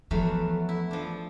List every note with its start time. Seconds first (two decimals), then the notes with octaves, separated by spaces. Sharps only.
0.11 E2 F3 F#3 A3
0.69 E4
0.91 F3 D4